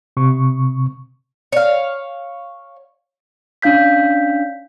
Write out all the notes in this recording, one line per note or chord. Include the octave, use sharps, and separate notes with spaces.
C3 C#6
C#5 F5
C#4 D4 F5 G6 B6